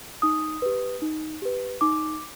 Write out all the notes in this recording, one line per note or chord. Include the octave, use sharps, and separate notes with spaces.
D#4 D#6
G4 B4
D#4
G4 B4
D#4 D6